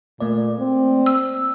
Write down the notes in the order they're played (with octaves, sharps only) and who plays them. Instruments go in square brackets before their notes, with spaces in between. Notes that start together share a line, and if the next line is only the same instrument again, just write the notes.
[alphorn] A#2 [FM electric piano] A3 A#3 D5
[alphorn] C4
[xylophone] E6